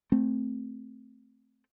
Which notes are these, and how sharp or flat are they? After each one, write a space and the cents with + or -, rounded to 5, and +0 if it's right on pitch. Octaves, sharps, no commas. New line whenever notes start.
A3 +0 C4 +0